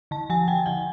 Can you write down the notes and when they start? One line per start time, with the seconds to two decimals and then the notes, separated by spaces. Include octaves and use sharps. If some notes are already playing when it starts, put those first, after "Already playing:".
0.11 D3 A5
0.30 F3 G#5
0.48 F3 G5
0.66 D3 F#5